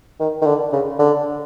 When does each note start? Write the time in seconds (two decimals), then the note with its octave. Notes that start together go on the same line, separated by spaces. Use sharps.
0.20 D#3
0.42 D#3
0.47 D3
0.73 C#3
0.99 D3